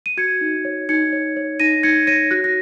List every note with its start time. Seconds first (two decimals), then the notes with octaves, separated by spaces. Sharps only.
0.06 D#7
0.17 F#4 G#6 C#7
0.41 D#4
0.65 C#5
0.89 D#4 G#6 C#7
1.13 C#5
1.36 C#5
1.60 D#4 A#6 D#7
1.83 D#4 G#6 C#7
2.07 C#5 A#6 D#7
2.31 F#4 F#6 A#6
2.44 A#6